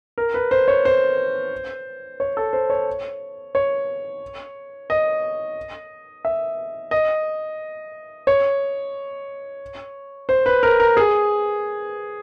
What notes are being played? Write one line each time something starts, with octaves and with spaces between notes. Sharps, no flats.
A#4
B4
C5
C#5
C5
C#5
A4
C5
C#5
C#5
D#5
E5
D#5
C#5
C5
B4
A#4
A#4
G#4